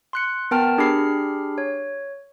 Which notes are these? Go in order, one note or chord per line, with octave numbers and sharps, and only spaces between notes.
C6 F#6 C#7
B3 A#4 G5 A5 F6
D4 G4 G#4 B5 F6 C7
C#5